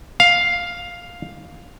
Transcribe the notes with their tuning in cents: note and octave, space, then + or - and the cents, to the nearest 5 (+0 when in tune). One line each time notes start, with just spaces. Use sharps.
F5 +5